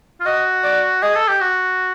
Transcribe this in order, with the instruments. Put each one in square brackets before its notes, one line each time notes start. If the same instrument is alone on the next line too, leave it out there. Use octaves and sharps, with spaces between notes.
[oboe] F4
[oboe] F#4 [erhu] D#5
[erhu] D5
[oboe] G#4 [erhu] D#5
[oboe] A4
G4
F#4